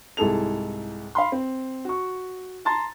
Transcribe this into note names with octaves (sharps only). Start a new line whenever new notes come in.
C2 G#2 E4 G#4 A4 F7
F5 B5 C6
C4
F#4 C#6
A5 A#5 C6 A6